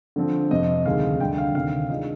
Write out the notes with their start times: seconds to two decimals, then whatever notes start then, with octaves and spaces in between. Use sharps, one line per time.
0.16 D3 F3 C4
0.51 F2 C3 F3 D#5
0.85 D2 C3 D#3 G#3 F5
1.20 D2 D3 G3 G5
1.38 F5
1.55 D2 C3 D#3 F5
1.90 D#3 G#3 D4 F4 D#5